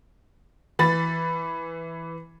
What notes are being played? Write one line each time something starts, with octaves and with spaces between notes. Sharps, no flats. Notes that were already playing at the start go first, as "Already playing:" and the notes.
E3 B5 A6